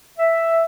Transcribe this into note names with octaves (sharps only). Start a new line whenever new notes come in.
E5